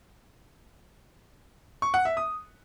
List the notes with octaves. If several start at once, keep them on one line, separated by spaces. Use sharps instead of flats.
C#6
F#5
E5
D#6